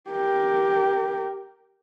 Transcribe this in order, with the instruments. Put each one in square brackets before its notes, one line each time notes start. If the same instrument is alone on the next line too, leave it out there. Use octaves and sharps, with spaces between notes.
[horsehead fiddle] G4 A#4